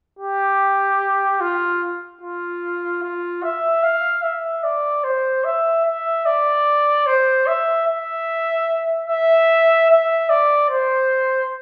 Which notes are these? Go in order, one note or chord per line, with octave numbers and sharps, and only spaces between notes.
G4
F4
F4
F4
E5
F5
E5
D5
C5
E5
E5
D5
C5
E5
E5
E5
E5
D5
C5